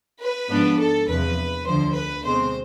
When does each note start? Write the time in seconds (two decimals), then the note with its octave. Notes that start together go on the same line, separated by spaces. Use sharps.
0.19 B4
0.49 G#2 F3 B3 D4
0.78 A4
1.07 E2 C3 F3 B4
1.65 D2 D3 F3 C5
1.94 B4
2.23 B2 G#3 C4 C5